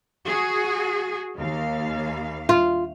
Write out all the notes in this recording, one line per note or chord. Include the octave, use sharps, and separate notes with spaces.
F#4 G#4
D#2 F5
F4